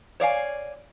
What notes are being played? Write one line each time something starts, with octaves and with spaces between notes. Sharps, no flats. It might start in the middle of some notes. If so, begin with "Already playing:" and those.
C#5 D5 F5 G#5